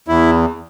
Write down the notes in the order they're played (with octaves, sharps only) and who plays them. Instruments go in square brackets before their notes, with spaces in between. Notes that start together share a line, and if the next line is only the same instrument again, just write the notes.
[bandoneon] E2 E4